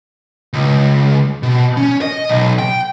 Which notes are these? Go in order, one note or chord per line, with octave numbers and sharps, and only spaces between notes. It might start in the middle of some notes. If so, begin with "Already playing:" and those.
C#2
B2
C#4
D#5
B1
G5